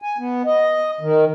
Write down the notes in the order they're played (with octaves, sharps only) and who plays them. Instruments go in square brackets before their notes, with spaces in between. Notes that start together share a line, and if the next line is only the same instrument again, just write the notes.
[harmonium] G#5
B3
D#5
D#3